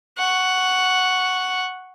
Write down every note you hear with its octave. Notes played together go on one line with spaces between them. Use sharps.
F#5 C#6